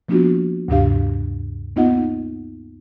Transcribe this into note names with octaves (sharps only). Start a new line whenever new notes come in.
F3 A#3 B3 D4 F4 F#4
D2 G2 C3 D4 G4 F5
A#3 B3 D#4 F4 D#5 F#5